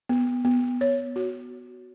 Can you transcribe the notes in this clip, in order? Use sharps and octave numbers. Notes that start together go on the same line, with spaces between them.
B3
B3
C#5
F#4